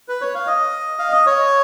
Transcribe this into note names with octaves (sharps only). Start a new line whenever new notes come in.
B4
C#5
F5
D#5
F5
D#5
C#5